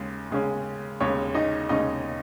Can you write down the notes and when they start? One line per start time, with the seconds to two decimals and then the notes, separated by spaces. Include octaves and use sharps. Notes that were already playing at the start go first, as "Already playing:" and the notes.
Already playing: D#2 C#3 G#3 C#4
0.31 D#2 C#3 G#3 C#4
1.00 D#2 C#3 G#3 C#4 C#5
1.35 D#4 D#5
1.69 D#2 C#3 G#3 C#4 D#4 D#5